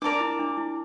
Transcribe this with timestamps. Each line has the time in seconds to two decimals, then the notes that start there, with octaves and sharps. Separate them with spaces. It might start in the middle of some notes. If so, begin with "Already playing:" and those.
0.02 D4 A#4 D5 A5 D6
0.20 E4
0.39 D4
0.57 E4